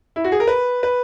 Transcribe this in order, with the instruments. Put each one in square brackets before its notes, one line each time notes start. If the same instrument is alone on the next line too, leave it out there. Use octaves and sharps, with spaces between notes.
[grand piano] E4
F#4
G#4
A#4
B4
B4